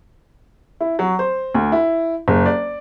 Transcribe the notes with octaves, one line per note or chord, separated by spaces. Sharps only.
E4
F#3
C5
D2
E4
F#1
D5